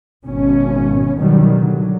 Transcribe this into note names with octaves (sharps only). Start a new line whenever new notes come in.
G#1 B2 C#4
B2 D#3 F#3 G3
D3 F#3